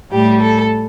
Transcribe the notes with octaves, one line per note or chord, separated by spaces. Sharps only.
A2 G3 G4
A4